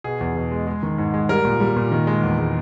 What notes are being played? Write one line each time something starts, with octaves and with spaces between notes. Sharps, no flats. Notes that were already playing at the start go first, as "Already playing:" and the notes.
B2 G#4
E2
B2
G#3
G#3
D#3
G#2
G#3
G3 A#4
A#2
G3
A#2
D#3
G#3
E2
G#3